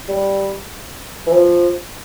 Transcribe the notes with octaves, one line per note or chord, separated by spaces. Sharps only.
G3
E3
F3